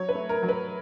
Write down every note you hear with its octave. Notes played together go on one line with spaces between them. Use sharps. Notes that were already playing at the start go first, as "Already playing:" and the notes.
Already playing: F#3 C#5
B4
A3
A#4
F#3
B4